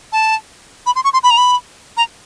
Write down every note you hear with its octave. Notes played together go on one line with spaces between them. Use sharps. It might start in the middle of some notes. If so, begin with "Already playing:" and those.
A5
B5
C6
C#6
C6
B5
A#5
B5
A#5